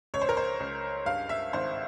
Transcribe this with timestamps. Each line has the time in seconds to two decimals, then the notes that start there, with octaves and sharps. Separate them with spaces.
0.14 C#2 C#5
0.22 C5
0.29 A#4
0.37 C5
0.60 C#2
1.06 G2 F5
1.29 E5
1.53 G#1 C5